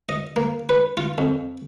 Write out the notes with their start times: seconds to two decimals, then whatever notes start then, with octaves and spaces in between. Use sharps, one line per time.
0.09 D#5
0.36 A#3
0.69 B4
0.97 F4
1.18 F2